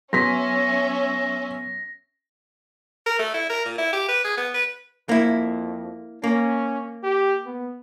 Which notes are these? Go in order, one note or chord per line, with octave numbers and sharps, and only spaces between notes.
F#3 B3 C#4 E5 C6 A#6 B6
A#4
A3
E4
A#4
A#2
E4
G4
B4
G#4
B3
B4
F2 A#3 E4
A#3 C#4
G4
B3